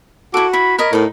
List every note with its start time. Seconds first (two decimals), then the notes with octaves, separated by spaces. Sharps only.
0.34 E4 F#4 A4 D6
0.53 E4 B5
0.78 A#4 C#5 D#5 B5
0.93 A2 D#4 A#4 B5